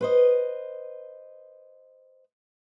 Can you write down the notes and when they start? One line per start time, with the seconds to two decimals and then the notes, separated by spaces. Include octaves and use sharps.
0.01 B4 C5 D#5